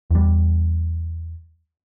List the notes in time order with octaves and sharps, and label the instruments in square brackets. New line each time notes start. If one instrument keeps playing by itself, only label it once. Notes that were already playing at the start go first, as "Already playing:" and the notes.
[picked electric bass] E2 G3